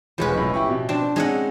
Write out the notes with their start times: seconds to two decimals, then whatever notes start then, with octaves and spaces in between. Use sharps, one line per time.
0.18 E1 F3 G#3 C#4 B4 B5
0.34 B1 A2
0.54 E4 G4 C#6
0.70 B2
0.89 C4 D4
1.16 G#3 C4 C#4 D#4 D#5 F#5